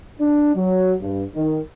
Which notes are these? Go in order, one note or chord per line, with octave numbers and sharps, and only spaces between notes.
D4
F#3
G2
D#3